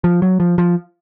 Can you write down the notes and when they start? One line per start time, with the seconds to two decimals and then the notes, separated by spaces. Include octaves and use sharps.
0.04 F3
0.22 F#3
0.40 F3
0.58 F3